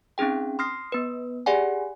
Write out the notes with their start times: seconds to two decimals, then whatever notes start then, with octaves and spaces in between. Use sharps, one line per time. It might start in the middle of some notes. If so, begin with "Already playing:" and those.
0.18 C4 C#4 D#4 G#4 G5
0.59 C6 D#6 F6 A#6 C7
0.92 B3 B4
1.46 G4 G#4 D5 F#5 G#5